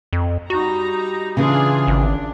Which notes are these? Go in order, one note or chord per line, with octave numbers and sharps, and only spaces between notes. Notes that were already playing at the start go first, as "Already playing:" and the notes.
F2
G3 D#4 F#4 A#5
C#3 E3 D4 F4 G#4
G#1 D4